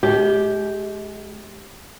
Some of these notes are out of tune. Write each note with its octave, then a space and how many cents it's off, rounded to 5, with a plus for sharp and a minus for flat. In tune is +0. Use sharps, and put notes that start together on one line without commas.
G#3 +35 G4 +0